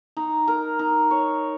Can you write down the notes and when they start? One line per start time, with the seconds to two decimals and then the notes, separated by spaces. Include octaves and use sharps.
0.17 D#4
0.48 A#4
0.79 D#4
1.11 C#5